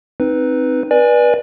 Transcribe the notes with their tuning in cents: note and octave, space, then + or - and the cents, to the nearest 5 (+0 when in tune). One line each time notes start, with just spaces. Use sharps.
C4 +0 D#4 +0 B4 +0
B4 -30 D5 +15 G#5 +0